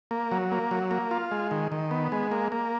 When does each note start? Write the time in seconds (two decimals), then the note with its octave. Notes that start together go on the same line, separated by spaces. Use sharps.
0.11 A#3
0.32 F#3
0.52 A#3
0.71 F#3
0.91 A#3
1.11 F4
1.31 G#3
1.51 D#3
1.72 D#3
1.91 B3
2.12 G#3
2.31 A#3
2.52 A#3